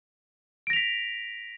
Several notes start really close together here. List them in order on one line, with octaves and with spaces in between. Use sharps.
D7 A#6 F7 B6